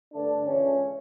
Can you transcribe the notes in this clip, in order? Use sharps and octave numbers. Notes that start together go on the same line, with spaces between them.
G2 D3 A3 D4
C#2 C#3 E3 C#4